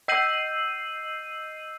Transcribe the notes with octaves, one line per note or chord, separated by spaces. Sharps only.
D#5 E6 G6 C7 D#7 F#7